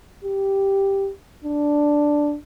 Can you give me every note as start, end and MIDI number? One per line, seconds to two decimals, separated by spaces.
0.24 1.10 67
1.44 2.36 62